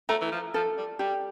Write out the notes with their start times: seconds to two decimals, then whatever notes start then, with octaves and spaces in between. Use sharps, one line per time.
0.09 A3 A#5
0.21 E3
0.32 F3
0.54 F3 A4
0.77 G3
0.99 G3 G4